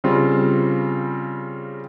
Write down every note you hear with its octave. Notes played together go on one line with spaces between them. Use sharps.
C#3 G3 C4 F4